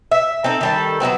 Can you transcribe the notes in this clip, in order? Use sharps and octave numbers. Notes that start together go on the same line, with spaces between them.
E5
C4 D#4 A4
D#3 G3 A4
F#3 G#3 B3 C4